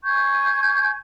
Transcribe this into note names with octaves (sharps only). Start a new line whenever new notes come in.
G#5 C#6 G6 G#6